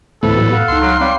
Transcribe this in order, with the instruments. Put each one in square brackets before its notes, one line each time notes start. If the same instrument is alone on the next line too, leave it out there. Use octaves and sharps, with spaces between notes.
[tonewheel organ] D2 E3 C4 [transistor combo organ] A2 B3 [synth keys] A3 [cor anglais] A4
[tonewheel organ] E3 F#3 G3
F5 F#5
[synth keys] C#2 D#4 [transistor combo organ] C6
[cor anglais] F#3
[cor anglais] G3 [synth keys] C4 C#5 F5